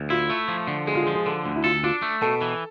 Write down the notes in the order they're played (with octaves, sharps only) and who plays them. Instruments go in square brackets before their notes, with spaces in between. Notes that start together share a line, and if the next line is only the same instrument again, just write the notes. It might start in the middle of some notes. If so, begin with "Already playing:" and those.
Already playing: [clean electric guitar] D2
[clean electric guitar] E4 [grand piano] F4
[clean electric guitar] A3
F3
D3
[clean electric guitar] G#3 [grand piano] G#4
[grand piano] F4
G#4
[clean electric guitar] F3
[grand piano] G#4
[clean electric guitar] D3 [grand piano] A4
[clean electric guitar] D2
[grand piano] E4
[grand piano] F4 [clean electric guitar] A4
[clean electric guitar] D4 [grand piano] F4
[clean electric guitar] A3
[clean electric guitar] B2 [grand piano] A4
[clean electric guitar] E3